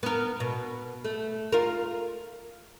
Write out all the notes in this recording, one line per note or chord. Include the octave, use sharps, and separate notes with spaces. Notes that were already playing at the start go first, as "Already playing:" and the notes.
B3 A#4
B2
A3
F4 A#4